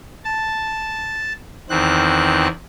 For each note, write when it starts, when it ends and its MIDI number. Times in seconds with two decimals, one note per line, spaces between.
0.24 1.33 81
1.69 2.48 40
1.69 2.48 51
1.69 2.48 60
1.69 2.48 90